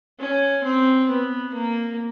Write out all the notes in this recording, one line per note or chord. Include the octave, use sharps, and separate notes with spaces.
C#4
C4
B3
A#3